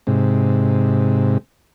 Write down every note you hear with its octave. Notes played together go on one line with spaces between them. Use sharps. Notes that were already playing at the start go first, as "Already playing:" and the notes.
G#2 C3